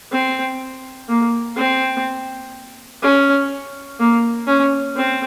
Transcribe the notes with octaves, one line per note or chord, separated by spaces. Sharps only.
C4
A#3
C4
C#4
A#3
C#4
C4